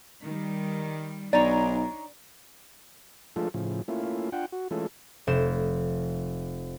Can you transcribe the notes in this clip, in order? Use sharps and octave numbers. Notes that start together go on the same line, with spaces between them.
D#3 G3
B1 D4 D#4 C#5 D5
F3 G#3 A3 D4 F4 A4
A2 C#3 F3
A3 A#3 C#4 E4 F4
D4 F4 F#5 G5
F#4
E3 G#3 A3 C#4 F4 A4
F1 C5 E7